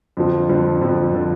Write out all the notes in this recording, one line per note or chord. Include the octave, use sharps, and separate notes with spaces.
F2 D3 F3
F2 D3 F3
F2 D3 F3
D3 F3